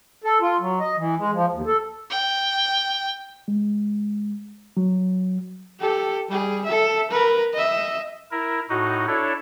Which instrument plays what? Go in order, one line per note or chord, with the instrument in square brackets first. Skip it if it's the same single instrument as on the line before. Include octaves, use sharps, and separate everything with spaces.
[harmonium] A4
F4
F#3
D#5
E3
G#3
F3
D#2
A4
[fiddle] G5
[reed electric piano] G#3
F#3
[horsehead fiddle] G4 A4
G3 G#4
A4 E5
A#4 B4
D#5 E5
[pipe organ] E4 A#4
A2 D#4 F#4
D4 E4 A4 C#5